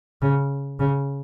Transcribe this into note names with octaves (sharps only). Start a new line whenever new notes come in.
C#3
C#3